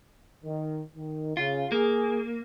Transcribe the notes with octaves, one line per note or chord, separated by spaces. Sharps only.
D#3
D#3
C#3 F4
A#3 G#4